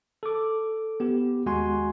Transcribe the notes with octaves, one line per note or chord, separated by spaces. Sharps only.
A4 D6
B3 G4
D#2 G#3 F#4 G#5 C6